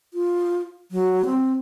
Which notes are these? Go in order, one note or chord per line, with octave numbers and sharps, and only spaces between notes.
F4
F#3
C4